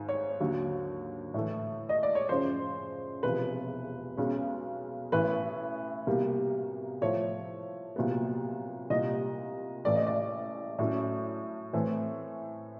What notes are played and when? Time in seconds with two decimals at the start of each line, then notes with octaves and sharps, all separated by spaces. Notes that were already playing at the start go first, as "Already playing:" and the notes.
Already playing: G#1 G#2
0.09 C#5
0.40 D#2 D3 F#3
1.34 A2 E3 A3
1.89 D#5
2.03 D5
2.15 C#5
2.29 F#2 C#3 F3 C5
3.23 E1 E2 C3 F3 B4
4.17 B1 B2 G#3 C#4
5.12 A1 A2 E3 B4
6.07 C2 B2 G3 A#3
7.01 A2 F3 A3 C#5
7.96 C2 A#2 F#3 B3
8.90 C2 A#2 G3 D#5
9.85 A1 A2 E3 A3 D5
9.95 D#5
10.07 D5
10.79 A2 F#3 A3 C#4
11.73 A2 E3 A3 C4